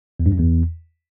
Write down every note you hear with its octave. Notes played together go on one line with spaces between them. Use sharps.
E2
G2
F#2
E2